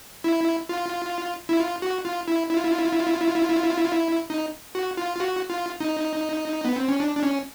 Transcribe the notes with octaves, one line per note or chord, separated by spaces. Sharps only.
E4
F4
E4
F4
F#4
F4
E4
E4
F4
E4
F4
E4
F4
E4
F4
E4
F4
E4
F4
E4
F4
E4
F4
E4
F4
E4
F4
E4
D#4
F#4
F4
F4
F#4
F4
D#4
B3
C4
C#4
D4
D4
C#4